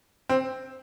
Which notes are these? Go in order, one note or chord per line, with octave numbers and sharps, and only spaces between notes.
C4